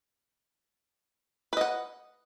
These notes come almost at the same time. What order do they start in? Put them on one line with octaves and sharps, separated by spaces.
B4 D#5 F#5